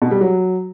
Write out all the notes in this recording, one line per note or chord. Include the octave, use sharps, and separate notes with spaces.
B2
G3
F#3